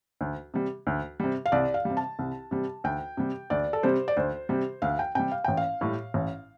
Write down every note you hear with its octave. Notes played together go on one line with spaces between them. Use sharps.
D2
C3 G3
D2
C3 G3
F5
C2 D5
F5
C3 G3
A5
C2
C3 G3
D2 G5
C3 G3
D2 D5
A4
C3 G3 C5
D5
D2 C5
C3 G3
D2 F5
G5
C3 G3 G5
F5
A1 G5
F5
A2 G3
A1